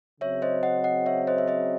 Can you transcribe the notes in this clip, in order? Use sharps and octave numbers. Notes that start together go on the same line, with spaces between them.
C#3 F#3 C4 C#5 E5
C5 D#5
D#5 F#5
D#5 F#5
C#5 E5
C5 D#5
E5
C5 D#5